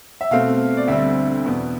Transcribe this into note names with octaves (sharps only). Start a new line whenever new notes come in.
E5
B2 A3 C4 F5
D5
D2 D3 G3 C4 E5
E2 B2 B3